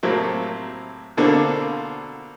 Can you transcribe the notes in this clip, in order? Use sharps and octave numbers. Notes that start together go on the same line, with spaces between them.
A2 C3 F#3 A#3 C4
B2 D3 A#3 C4 D4 F4